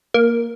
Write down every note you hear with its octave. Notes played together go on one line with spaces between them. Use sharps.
A#3